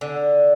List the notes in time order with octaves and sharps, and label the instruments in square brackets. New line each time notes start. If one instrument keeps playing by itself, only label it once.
[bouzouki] D3